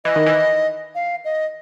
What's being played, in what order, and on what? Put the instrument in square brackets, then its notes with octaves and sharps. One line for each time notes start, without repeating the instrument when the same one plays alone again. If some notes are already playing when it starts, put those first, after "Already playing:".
[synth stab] E3 [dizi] D#5
[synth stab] D#3
E3
[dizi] F5
D#5